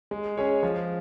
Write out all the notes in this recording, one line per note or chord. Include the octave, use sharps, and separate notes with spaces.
G#3
C#4 G#4 C#5
F3